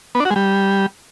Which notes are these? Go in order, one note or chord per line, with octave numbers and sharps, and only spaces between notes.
B3
D4
F#4
G#3
G3